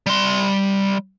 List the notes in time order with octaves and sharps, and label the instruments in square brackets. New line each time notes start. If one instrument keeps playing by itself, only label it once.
[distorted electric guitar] G3 C6